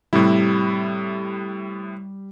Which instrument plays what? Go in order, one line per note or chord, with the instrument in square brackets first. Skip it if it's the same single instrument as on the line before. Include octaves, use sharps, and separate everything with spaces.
[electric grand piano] A2 C3 E4 [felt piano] G3